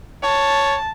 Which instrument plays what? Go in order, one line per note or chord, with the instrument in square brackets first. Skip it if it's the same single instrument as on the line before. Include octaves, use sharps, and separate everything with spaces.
[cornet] C#5 [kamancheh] A5